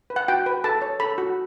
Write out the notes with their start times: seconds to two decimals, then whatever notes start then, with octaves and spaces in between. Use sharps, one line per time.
0.10 B4
0.16 F#5
0.28 F#4 G5
0.46 B4
0.64 A4 A5
0.82 C#5
1.00 A4 B5
1.18 F#4